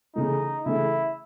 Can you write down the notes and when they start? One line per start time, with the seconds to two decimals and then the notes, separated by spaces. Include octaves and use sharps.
0.15 C#3 E3 A3 D#4
0.65 C#3 E3 A3 E4